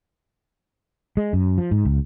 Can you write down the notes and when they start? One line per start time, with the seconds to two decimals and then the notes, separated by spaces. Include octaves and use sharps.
1.17 G#3
1.33 F#2
1.58 F3
1.71 G#2
1.85 C#2